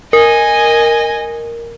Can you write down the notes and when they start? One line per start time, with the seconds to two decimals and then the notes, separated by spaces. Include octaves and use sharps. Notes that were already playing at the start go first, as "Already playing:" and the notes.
0.13 A#4 D#5 G#5